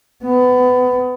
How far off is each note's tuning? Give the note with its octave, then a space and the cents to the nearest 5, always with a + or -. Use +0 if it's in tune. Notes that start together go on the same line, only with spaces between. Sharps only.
B3 +25